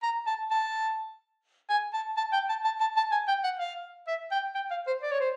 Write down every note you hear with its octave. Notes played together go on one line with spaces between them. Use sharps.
A#5
A5
A5
G#5
A5
A5
G5
A5
A5
A5
A5
G#5
G5
F#5
F5
E5
G5
G5
F5
C5
D5
C#5
C5